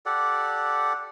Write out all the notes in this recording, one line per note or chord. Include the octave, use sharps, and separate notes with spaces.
G4 A4 D5 F#5